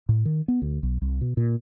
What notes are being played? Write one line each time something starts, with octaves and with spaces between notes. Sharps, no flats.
A2
D#3
B3
D2
B1
C2
B2
A#2